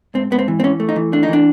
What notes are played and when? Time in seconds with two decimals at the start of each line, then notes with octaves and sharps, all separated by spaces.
0.14 G#2 C4
0.31 G#2 B3
0.39 C4
0.48 E3
0.60 C4
0.64 E3 C#4
0.80 A3
0.89 D#4
0.96 E3
1.12 A3 D4
1.23 D#4
1.28 E3 D4